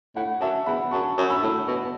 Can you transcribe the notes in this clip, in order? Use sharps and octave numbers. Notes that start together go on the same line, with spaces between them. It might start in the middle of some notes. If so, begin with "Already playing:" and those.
A2 F#5
F#2 E5 A5
E2 F#5 B5
F#2 A5 C#6
F#2
B5 E6
A2
B2